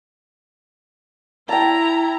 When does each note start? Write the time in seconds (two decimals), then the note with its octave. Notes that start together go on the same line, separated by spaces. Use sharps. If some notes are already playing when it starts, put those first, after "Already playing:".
1.49 E4 G5 A5 A#5